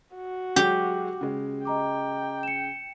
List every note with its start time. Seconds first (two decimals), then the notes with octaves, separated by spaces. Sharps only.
0.14 F#4
0.56 F#3 G#3 G4
1.21 C#3 G#3
1.65 D#5 G5 A#5 D6
2.43 C#7 E7